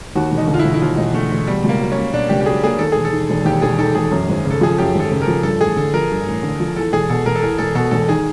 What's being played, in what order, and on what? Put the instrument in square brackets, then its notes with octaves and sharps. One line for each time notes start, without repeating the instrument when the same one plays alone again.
[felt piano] D#2 [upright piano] F#4
[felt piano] E1
[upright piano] D#4
[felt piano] D3
[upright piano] F4
[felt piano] E1 [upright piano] E4
[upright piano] E4
[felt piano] D#2 [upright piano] F4
[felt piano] E1 [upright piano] D#4
[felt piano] D3 [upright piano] A3
[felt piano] E1
[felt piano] B2 [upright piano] G3
[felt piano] C#2 [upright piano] A#3
[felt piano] F#3
[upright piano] C#4
[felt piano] A#3
[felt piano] B2 [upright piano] D4
[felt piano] C#2 [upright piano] G4
[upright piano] G4
[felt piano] F#3 [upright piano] G#4
[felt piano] A#3 [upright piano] G#4
[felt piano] D#2 [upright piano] A4
[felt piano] E1 [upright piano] G#4
[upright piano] A4
[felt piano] D#3
E1
[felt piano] D#2 [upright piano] G4
[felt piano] E1 [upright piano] G#4
[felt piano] D#3 [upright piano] A4
[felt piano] E1 [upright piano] G#4
[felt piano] F#2
G#1
C#3
[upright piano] A4
[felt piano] F3 [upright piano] G#4
[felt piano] F#2 [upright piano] G4
[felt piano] G#1
[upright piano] A4
[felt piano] C#3
[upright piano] A#4
[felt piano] F3
[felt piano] G2 [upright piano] A4
[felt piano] A1 [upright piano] G#4
[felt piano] D3 [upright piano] A4
[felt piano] F3 [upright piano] A#4
[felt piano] G2
A1
D3
F3
[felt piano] E2 [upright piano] A4
[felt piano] E1 [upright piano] G#4
[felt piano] B2 [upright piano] A4
[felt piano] E1 [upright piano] A#4
[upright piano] A4
[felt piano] E2 [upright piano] A#4
[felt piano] E1 [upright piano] A4
[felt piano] B2 [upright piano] A4
[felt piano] E1 [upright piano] A4
[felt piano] D#3 [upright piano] G#4